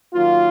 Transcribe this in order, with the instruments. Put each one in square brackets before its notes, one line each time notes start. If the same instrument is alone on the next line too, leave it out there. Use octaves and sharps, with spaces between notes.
[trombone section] D#3 F#3 A#3 F4